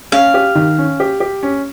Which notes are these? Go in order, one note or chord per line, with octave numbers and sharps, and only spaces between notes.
C#4 F5
G4
D#3
C#4
G4
G4
C#4